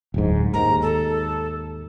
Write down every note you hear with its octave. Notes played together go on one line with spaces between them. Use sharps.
D1 G#2
D#2 G#2 A#5
A4